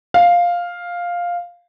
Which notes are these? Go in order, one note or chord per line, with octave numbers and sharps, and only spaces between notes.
F5